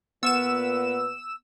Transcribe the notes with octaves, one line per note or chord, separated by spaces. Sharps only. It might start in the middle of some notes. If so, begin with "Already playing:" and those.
A#2 B3 B4 F#5 E6 E7